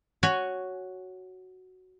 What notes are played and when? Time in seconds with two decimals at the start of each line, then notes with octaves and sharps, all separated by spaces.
0.23 F#4 C#5 G#5